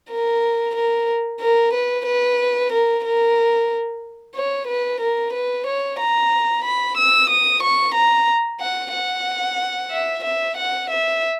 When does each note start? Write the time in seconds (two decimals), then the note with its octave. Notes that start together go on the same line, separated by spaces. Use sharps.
0.11 A#4
0.76 A#4
1.40 A#4
1.74 B4
2.06 B4
2.73 A#4
3.05 A#4
4.36 C#5
4.68 B4
5.01 A#4
5.33 B4
5.67 C#5
6.00 A#5
6.65 B5
6.98 E6
7.30 D#6
7.63 C#6
7.95 A#5
8.60 F#5
8.93 F#5
9.91 E5
10.24 E5
10.57 F#5
10.90 E5